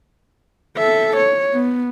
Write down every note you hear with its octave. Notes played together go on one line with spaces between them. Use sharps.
A4 E5
C#5
B3